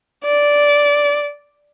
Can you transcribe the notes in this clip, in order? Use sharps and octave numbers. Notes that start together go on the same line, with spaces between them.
D5